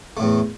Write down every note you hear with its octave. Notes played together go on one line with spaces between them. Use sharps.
E2 A2 A3